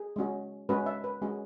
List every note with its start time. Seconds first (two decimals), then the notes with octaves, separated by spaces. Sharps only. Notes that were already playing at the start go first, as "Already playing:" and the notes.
Already playing: G#4
0.16 G#3 C#4 F#4
0.69 G#3 C#4 F#4 B4
0.86 E5
1.04 B4
1.22 G#3 C#4 F#4 G#4